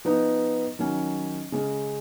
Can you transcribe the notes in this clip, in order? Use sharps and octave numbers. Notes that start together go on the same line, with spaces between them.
F3 B3 D#4
D#3 F#3 C#4
C#3 G#3 C#4